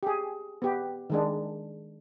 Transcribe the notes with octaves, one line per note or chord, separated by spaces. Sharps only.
G4 G#4
B3 G4
D#3 G#3 D4